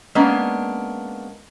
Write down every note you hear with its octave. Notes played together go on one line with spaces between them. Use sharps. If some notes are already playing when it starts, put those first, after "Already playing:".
G#3 A#3 B3 C#4 D4